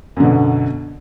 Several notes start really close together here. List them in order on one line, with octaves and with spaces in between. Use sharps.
F#2 D3 B2